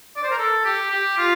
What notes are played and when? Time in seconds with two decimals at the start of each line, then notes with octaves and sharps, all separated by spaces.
0.16 D5
0.23 C5
0.31 A#4
0.38 A4
0.65 G4
0.91 G4
1.18 F4